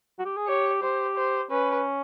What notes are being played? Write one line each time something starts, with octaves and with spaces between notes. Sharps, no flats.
F#4
G4
G#4
G4 C#5
G4 C5
C5
C#4 B4